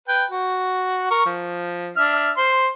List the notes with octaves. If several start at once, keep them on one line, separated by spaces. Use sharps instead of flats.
B4 G5
F#4
A#4 C#6
F3
D4 E5 F6
C5 C6